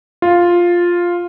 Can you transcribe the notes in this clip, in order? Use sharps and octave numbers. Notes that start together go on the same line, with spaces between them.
F4